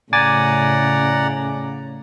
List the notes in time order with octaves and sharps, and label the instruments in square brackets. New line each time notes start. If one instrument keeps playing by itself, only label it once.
[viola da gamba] A2 C#3 [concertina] D5 F#5 A#5 [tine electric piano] G#5 D6 A6